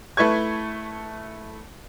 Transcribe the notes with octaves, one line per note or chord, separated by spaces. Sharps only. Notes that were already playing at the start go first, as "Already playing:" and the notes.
A3 E4 B4 C#6 G#6